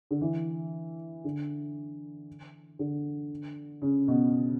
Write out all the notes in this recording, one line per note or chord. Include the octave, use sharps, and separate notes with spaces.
D3
E3
D3
D3
C#3
B2